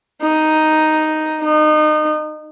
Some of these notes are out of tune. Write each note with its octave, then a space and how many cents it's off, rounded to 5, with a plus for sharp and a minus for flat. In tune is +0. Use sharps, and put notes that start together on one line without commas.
D#4 +0
D#4 -30